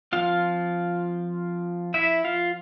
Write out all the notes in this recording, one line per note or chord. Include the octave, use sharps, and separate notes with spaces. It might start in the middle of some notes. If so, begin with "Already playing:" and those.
F3 C4 F4 F5
E4 E5
F4 F5